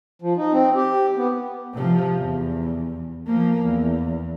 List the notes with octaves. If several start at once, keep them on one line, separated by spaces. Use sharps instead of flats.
F3
D#4
C4
G4
B3
C3 F3
E2
F3 A#3
E2